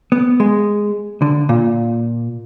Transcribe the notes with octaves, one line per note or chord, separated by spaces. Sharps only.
B3
G#3
D3
A#2